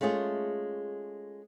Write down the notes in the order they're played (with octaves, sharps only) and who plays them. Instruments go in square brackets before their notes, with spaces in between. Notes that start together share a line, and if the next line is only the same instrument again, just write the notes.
[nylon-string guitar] G#3 A3 C#4 F4 G#4